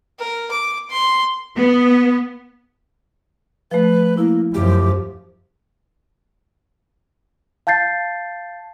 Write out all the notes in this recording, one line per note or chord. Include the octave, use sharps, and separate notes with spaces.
A#4
D6
C6
B3
F3 A3 B4
A#3 E4
F#2 F3 G4
F5 A5 G6 A6 C7